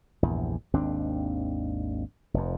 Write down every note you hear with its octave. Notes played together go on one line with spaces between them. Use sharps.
A#1 E2 G2
G#1 D#2 C4 D4
F1 F2